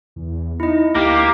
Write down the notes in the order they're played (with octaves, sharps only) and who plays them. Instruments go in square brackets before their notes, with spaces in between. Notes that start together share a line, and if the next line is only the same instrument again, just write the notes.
[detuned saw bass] E2
[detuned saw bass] D#4 [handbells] E4 D#5
[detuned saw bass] D2 [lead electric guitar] A#3 [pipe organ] G4